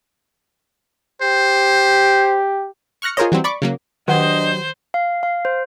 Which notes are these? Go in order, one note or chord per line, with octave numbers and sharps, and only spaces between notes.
G4 C5
C#6 F6 F#6 A#6 C#7
F4 G#4 A#4 C5 C#5 D#5
E3 F#3 G3 C4
D5 B5 C#6 D6
C#3 F#3 A#3
D#3 F#3 D4 G4 C5 D#5 F#5
F5
F5
C5